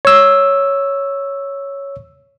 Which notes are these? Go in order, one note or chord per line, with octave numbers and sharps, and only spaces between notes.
C#5 E6